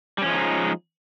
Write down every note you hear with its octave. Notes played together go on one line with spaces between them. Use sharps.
F3 G3 G#3 C#4 D#4